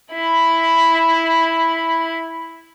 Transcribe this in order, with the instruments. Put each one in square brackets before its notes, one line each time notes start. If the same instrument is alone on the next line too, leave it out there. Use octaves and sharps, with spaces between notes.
[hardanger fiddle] E4 B5